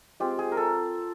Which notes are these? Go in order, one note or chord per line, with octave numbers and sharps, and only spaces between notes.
G#3 C4 F4 G4
G#4
A#4
A4